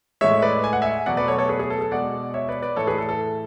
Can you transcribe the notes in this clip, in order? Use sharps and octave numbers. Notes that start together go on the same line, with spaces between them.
A2 G#3 C#5 E5
B4 D5
G#5
F#5
E5 G#5
B2 F#3 A3 D5 F#5
B4 D5
A4 C#5
A4 C#5
G#4 B4
G#4
A4
A4
B2 G#3 D5 F#5
C#5 E5
B4 D5
B4 D5
A2 E3 A3 A4 C#5
G#4 B4
A4
A4